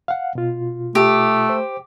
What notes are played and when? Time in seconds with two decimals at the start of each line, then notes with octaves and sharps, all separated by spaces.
0.08 F5 F#5
0.35 B2 F4
0.95 A3 G4
1.49 C5